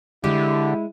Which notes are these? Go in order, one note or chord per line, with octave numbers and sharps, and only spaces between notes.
D3 G#3 E4 G4